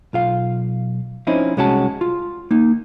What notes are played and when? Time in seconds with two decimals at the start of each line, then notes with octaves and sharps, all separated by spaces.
0.13 B1 F4 F5
1.27 F3 C4 C#4 D#4 E4
1.57 C2 G#3 C#4 F#4 G#4 A5
2.01 F4
2.51 A#3 D#4